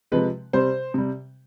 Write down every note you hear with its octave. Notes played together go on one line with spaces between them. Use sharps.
C3 F3 G#3 B4
C3 G3 C5
C3 G3